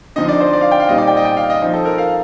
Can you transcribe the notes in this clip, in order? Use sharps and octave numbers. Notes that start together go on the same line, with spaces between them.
D3 F3 C4 D#4 D#5
D5
C5
D5
F5
G5
F5
A#2 G3 C4 D#4 D#5
D5
G5
D#5
G5
F5
D#5
F3 C4 D#4
A4
A#4
F5